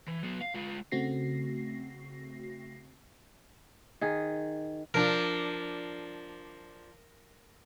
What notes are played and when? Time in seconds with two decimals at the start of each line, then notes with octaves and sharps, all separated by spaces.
0.08 E3
0.23 F#3 B3
0.41 F5
0.54 G#3 F4
0.92 C#3 A3 C4 F#4 A#6 C7
4.01 D#3 G#4
4.94 F3 D4 F4 A#4